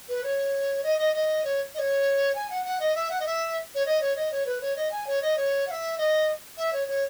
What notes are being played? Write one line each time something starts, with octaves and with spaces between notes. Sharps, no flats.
B4
C#5
D#5
D#5
D#5
C#5
D#5
C#5
G#5
F#5
F#5
D#5
E5
F#5
D#5
E5
C#5
D#5
C#5
D#5
C#5
B4
C#5
D#5
G#5
C#5
D#5
C#5
F#5
E5
D#5
E5
C#5
C#5